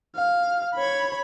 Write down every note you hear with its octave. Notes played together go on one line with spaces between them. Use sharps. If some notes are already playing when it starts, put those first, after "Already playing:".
F5
C#5 B5